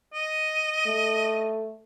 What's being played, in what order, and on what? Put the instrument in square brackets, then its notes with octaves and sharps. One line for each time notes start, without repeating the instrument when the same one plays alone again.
[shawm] D#5
[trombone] A3